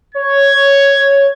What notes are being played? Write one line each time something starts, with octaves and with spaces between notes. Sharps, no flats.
C#5 G#6